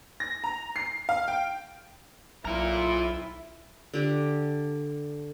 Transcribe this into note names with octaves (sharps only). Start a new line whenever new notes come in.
A#6
A#5
C7
F5
G5
B1 E4 F4 A#5
D3 G4